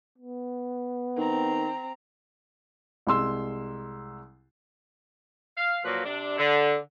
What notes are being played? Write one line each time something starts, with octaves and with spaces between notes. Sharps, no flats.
B3
D#3 C4 A#5
C2 G#3 C6 E6
F5
A#2 F3 F#3 A#3 B4
C3 D4
D3